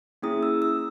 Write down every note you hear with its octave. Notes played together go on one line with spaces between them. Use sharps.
A#3 C#4 E4 G#4 D#6
E6
E6